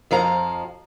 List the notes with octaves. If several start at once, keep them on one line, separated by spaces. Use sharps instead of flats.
F2 F3 F5 A#5